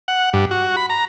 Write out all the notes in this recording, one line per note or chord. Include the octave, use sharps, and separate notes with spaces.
F#5
G2
F#4
B5
A#5